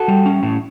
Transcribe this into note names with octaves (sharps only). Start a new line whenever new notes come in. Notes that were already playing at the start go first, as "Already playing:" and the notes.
Already playing: F#4 A4
G3
C#4
A2